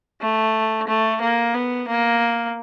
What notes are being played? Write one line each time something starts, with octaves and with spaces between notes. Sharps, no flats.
A3
A3
A#3
B3
A#3